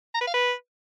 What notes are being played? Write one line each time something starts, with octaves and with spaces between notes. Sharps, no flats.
A#5
B4
F5
B4